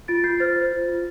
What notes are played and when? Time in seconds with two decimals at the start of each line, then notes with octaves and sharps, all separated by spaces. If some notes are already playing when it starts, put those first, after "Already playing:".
0.08 F4 A6 D7
0.24 F4 G6 C7
0.40 C5 F6 A6
0.56 C5
0.73 F4
0.88 F4